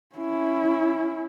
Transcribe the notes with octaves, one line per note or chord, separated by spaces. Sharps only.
C#4 E4